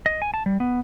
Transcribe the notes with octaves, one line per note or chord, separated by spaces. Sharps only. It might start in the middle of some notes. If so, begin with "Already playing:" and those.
D#5
G#5
A5
G3
B3